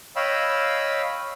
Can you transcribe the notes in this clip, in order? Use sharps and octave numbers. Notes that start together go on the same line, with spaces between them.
C#5 D#5 F5 G5 B5 E6